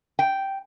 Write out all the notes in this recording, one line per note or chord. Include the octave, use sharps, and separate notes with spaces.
G5